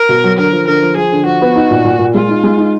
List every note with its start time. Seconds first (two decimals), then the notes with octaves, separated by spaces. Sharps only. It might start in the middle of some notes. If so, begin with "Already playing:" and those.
Already playing: A#4
0.09 B2
0.24 F#3
0.38 D3 A#4
0.52 F3
0.67 D3 A#4
0.82 F3
0.97 F3 G#4
1.12 D3
1.26 F3 F#4
1.41 B3
1.56 D#4
1.71 A#2
1.85 A#2
1.99 A#2
2.14 G#3 F4
2.29 D#4
2.43 G#3
2.58 D#4